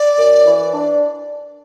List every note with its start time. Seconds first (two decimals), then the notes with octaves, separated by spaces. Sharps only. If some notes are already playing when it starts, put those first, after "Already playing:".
Already playing: D5
0.18 F#2
0.44 E3
0.73 D4